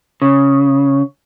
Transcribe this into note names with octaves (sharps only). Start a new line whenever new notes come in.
C#3